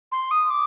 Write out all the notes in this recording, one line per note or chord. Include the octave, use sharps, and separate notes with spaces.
C6
D#6
D6